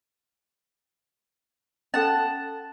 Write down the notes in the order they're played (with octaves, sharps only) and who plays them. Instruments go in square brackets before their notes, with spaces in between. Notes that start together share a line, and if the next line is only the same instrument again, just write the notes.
[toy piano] C#4 A4 [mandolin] F#5 A5